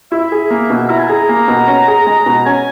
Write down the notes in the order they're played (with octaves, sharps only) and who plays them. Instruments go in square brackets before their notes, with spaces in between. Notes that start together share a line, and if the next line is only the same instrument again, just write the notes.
[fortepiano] E4 [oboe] E5
[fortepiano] G#4
A#3
B2
[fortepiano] E4 [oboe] A#5
[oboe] G#5
[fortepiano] G#4 [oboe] A#5
[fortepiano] A#3
B2
C#4
G#4
G#3
B2
[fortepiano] C#4 [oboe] G#5